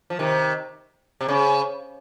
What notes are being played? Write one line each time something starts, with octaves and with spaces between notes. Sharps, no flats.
F3
C3 D#3
C3
C#3